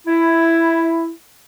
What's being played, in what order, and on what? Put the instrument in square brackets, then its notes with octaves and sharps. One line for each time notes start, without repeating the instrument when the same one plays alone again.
[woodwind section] E4